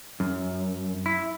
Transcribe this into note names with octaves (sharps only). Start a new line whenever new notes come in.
F#2
E4